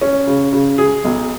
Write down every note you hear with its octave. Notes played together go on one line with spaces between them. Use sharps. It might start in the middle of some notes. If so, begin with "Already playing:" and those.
C#4
C#3
C#3
G#4
B1